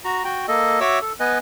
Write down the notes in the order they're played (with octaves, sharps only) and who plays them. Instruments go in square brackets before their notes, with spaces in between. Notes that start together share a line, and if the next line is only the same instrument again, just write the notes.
[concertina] F#4 A#5
F#4 G5
A#3 A4 D#5
F#4 C#5 E5 D6 E6
A4
B3 B4 D#5 G#5